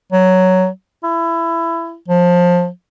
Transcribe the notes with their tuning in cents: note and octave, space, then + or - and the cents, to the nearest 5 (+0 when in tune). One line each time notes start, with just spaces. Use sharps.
F#3 +5
E4 +20
F3 +20